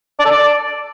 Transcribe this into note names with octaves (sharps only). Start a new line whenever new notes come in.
D5
A4
D5